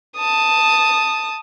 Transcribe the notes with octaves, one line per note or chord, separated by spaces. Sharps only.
A5 D#6